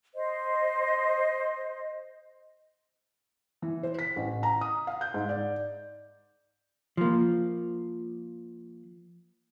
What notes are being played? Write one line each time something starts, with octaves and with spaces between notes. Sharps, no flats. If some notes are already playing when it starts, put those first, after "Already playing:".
C5 D#5
E3
C5
B6
A1
A#5
D#6
F5
G6
G#2
D5
F3 A#3